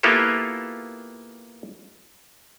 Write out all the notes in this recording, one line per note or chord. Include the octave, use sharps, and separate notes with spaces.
A#3 B3 E4 F4 G4 A4